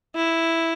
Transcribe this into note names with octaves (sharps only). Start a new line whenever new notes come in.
E4